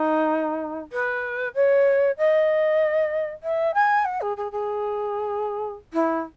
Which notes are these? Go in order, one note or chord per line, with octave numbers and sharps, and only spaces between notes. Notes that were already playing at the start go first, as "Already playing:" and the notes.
Already playing: D#4
B4
C#5
D#5
E5
G#5
F#5
G#4
G#4
G#4
E4